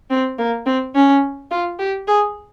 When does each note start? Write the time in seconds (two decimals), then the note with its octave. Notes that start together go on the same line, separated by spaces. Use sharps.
0.10 C4
0.38 A#3
0.66 C4
0.95 C#4
1.51 F4
1.79 G4
2.07 G#4